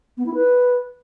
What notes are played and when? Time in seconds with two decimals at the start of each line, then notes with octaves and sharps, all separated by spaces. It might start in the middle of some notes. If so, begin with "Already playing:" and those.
0.17 B3
0.26 E4
0.34 B4